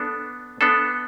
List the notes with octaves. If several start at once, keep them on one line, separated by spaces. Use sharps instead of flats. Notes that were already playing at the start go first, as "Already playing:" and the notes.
Already playing: B3 D4 A4
B3 D4 A4